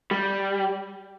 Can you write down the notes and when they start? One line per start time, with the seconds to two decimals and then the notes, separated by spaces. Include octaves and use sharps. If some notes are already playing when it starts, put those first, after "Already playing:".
0.11 G3